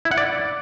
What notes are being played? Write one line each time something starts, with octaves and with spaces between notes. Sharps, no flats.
E4
F#5
D5